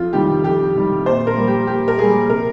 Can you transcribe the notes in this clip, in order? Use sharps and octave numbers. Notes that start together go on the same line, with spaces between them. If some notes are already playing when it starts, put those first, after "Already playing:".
Already playing: F2 F4
C3 D#3 G3 G4
F2 G4
C3 D#3 G3
A#2 C5
A#4
G3 A#3
G4
A#2 G4
A#4
G3 A#3 G#4
C3 A#4